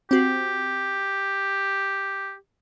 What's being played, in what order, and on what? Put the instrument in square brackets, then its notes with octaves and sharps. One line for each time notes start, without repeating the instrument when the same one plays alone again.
[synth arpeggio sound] C4 F#4 [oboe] G4